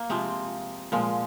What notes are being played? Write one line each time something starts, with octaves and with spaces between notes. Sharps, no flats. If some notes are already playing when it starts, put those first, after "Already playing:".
Already playing: A#3
C3 F3 G#3 C4
A#2 F3 G#3